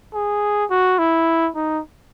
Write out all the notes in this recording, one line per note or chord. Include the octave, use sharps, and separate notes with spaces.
G#4
F#4
E4
D#4